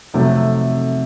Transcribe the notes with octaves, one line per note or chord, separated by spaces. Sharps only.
F2 C3 D#3 F#3 A3